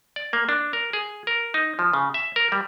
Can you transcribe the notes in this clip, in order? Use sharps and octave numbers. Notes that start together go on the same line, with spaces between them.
D5
A#3
D4
A#4
G#4
A#4
D#4
F3
C#3
E5
A#4
G3